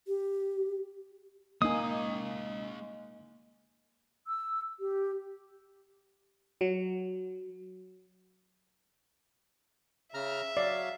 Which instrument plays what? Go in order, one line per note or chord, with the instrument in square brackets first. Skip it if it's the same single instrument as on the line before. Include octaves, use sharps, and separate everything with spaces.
[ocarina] G4
[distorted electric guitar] G#3 F5 [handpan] A#3 D#4 [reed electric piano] D#5 G#5 [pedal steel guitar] D#6
[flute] E6
G4
[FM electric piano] F#3
[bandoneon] C#3 A#5 F6 [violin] E5
[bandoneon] F#3 F5 [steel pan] D5